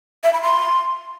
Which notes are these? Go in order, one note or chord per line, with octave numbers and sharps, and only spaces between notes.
E5
B5
C6